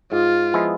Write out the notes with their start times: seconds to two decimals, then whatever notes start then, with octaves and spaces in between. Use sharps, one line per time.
0.12 G#2 F4
0.54 F3 G#3 B3 E4